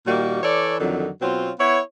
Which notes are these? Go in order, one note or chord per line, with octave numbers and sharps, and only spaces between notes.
A#2 D#3 G3 A#3 F#4
E3 A4 C#5 D5
F2 D3 D#3 F#3
B2 F#3 C4 C#4 F4
B3 E4 C#5